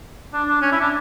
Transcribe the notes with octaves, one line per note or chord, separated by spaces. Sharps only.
D4
D4
C#4
E4
D4